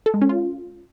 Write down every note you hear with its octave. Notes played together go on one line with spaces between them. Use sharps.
A4
G#3
C#4
F4